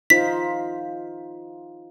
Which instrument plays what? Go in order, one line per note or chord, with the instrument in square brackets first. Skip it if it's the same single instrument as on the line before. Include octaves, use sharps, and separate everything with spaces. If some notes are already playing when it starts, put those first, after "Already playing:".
[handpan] D#4 F4 C5 [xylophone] B6